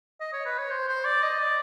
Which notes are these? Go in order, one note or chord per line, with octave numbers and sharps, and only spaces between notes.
D#5
C#5
B4
C#5
C5
C5
D5
D#5
D5